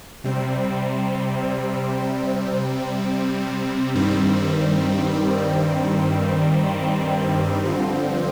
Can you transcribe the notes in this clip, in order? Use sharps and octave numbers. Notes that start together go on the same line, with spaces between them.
C3 G3 C4
G2 D#3 G3 C4
G2 D3 F3 C4